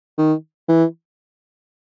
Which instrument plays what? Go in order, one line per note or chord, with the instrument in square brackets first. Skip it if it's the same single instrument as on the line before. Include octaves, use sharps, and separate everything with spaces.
[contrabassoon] D#3
E3